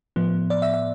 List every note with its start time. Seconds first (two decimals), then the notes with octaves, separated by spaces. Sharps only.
0.16 A2 F3 B3
0.50 D5
0.62 E5
0.74 E5